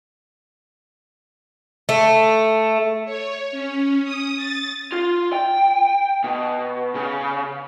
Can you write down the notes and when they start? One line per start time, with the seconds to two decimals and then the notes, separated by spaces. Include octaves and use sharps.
1.89 A3
3.05 C#5
3.51 C#4
4.03 D#6
4.37 A6
4.92 F4
5.33 G5
6.24 B2
6.95 C#3